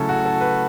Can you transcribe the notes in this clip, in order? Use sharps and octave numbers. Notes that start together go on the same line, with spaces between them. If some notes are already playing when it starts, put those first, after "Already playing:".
Already playing: C#3 F#3 A3 C#4 E4 A4
F#4
A4
B4